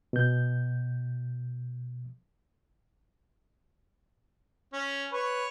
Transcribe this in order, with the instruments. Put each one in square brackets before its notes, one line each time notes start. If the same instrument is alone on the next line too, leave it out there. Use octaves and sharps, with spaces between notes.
[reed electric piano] B2 G6
[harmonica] C#4
[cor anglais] B4 [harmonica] C#5